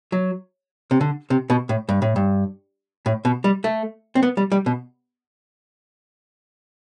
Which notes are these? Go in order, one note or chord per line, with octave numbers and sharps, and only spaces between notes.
F#3
C3
D3
C3
B2
A2
G2
A2
G2
A2
B2
G3
A3
C4
B3
G3
G3
B2